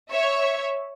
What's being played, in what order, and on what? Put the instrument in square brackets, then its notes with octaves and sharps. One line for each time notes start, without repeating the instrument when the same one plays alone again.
[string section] C#5 E5